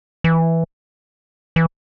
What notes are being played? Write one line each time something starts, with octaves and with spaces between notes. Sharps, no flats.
E3
E3